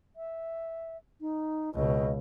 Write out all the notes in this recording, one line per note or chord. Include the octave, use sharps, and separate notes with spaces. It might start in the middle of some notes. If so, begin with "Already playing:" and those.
E5
D#4
C#2 B2 D#5